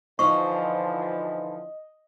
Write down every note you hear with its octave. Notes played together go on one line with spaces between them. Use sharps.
D3 E3 F3 D#4 F4 C5 D#5 C#6